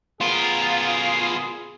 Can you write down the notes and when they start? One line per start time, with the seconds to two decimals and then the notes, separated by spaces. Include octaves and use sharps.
0.21 B2 F4 G#4 A#4